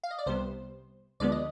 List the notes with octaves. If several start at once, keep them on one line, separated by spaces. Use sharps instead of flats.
F5
D#5
D5
C2 C3 G3 B3 C5
D2 D3 F3 G#3 B3 D5
D#5